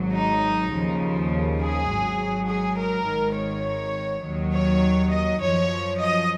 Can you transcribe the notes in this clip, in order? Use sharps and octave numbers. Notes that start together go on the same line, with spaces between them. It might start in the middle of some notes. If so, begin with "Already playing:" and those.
Already playing: G#1 G#2 F#3
D#4
D#2 C#3 F3
G#4
G#1 G#2 F#3
G#4
A#4
G#1 G#2 D#3
C#5
D#2 D#3 F#3
C#5
D#5
F#2 F3 C#5
D#5